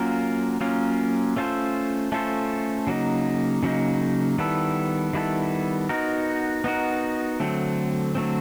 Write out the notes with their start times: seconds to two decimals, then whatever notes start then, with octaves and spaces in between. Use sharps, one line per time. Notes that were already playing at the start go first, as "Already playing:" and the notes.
Already playing: F#3 A#3 C#4 F4 A#4
0.61 F#3 A#3 C#4 F4 A#4
1.36 A3 C#4 F4 A4 C5
2.12 A3 C#4 F4 A4 C5
2.87 C#3 F#3 A#3 D#4
3.63 C#3 F#3 A#3 D#4
4.38 D#3 G3 B3 E4 A4
5.13 D#3 G3 B3 E4 A4
5.89 B3 D#4 F#4 A#4
6.64 B3 D#4 F#4 A#4
7.40 D3 F#3 A3 C4
8.15 D3 F#3 A3 C4